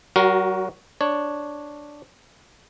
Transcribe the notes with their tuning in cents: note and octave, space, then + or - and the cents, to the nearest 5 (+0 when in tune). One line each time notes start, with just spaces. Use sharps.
F#3 +40 F#4 +0 A#4 +10
D4 +0 C#5 +0